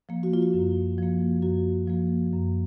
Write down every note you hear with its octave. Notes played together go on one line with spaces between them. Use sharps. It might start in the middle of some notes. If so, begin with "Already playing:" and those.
F3 A#3
F#4
F4
F#4
F#2
F3 A#3
F#2 F#4
F3 A#3
F#2